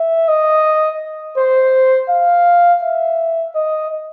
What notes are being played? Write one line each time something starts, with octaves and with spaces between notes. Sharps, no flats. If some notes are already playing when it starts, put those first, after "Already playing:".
Already playing: E5
D#5
C5
F5
E5
D#5